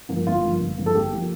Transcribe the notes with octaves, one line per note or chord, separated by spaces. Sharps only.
G2 F3 A#3
G1 F4
G2 F3 A#3
G1
G2 F3 A#3
A4
G1 G4
F3 A#3